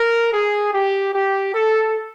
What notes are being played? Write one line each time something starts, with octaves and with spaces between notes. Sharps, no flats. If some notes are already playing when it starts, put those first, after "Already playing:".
Already playing: A#4
G#4
G4
G4
A4